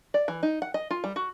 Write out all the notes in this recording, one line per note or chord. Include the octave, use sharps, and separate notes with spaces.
D5
E3
D#4
F#5
D#5
F4
G3
F#4